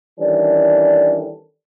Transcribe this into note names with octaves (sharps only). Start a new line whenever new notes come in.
D#3 E3 G3 C#4 D4 A4